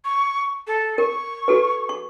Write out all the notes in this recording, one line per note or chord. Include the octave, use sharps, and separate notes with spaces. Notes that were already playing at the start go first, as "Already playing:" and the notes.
C#6
A4
A#4 C#6
F#4 A4 B4
C#6